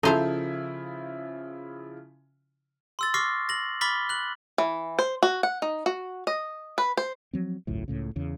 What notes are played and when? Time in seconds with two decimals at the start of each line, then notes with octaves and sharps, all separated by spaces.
0.03 C#3 F3 D#4 E4 A4 C5 F5
2.99 C6 E6 A6
3.14 C#6 D6 F6 A#6 C7
3.49 A#6 F#7
3.81 B5 D6 F6 A6 B6 G7
4.09 F#6 F#7
4.58 E3
4.99 C5
5.23 F#4
5.43 F#5
5.62 D#4
5.86 F#4
6.27 D#5
6.78 B4
6.97 C5
7.33 F3 F#3 C4
7.67 G#1 C#2 F#2 A2
7.88 C#2 A2 C#3
8.16 E2 C#3